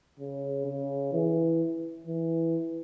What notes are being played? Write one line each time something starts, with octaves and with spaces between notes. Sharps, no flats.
C#3
C#3
E3
E3